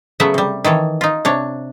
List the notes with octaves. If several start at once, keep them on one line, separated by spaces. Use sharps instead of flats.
C#3 F#3 A3 B3 E5 F#5
C3 G3
D#3 E3 A4 C#5
D#4 F4
C3 D4 C#5